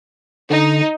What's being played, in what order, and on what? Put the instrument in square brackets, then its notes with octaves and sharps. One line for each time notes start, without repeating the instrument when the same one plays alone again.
[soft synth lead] D3 [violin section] D#4